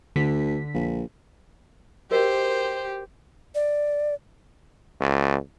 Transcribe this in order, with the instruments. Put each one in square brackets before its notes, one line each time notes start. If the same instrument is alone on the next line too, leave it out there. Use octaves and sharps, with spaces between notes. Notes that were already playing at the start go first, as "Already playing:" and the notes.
[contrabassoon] D2 [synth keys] D3 B6
[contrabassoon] A#1
[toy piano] F#4 A#4 D#5 [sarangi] G4 [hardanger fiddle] C5
[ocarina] D5
[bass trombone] C#2